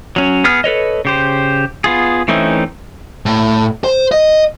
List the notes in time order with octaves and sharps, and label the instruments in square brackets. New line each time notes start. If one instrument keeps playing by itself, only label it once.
[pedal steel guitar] F#3 C#4
B3 G#4 F6
A4 B4 C#5 D#5
C#3 G4 C5
B3 F4 G#4
E3 A3 C4 C#4 D#4
[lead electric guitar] A2
C5
D#5